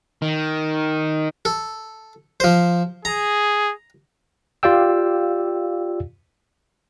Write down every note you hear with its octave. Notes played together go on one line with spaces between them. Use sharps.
D#3
A4
F3 C5
G#4 A#5
F4 G4 D5 F5 G5 E6